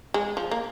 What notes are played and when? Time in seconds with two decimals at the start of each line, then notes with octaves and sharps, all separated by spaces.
0.14 G#3
0.37 F3
0.51 A#3